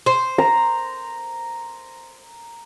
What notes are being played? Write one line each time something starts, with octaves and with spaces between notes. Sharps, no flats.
C5
A#5